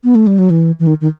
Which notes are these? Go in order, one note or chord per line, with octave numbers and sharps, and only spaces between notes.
B3
A3
G3
F#3
E3
E3
D#3
D#3